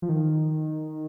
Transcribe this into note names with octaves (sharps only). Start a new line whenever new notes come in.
F3
D#3